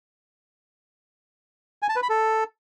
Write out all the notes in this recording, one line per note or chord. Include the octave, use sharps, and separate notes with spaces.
G#5
A5
B4
B5
A4